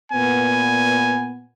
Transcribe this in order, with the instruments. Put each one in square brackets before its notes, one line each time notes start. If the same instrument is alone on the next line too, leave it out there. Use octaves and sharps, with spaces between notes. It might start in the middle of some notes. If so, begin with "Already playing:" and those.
[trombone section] A#2 B3 [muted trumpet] G#5